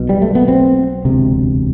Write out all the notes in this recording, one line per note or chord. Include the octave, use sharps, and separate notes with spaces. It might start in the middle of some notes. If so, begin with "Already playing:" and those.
Already playing: B1 B2
G3
A3
B3
C4
E1 D2 C3